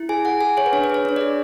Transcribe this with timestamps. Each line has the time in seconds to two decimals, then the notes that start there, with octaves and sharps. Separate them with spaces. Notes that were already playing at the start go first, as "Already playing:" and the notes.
Already playing: E4
0.09 G#4 G#5
0.25 G#4 F#5
0.41 G#4 G#5
0.57 G#4 C#5
0.66 B4
0.73 D4 C#5
0.84 B4
0.90 G#4 C#5
1.05 D4 C#5
1.16 D5
1.21 G#4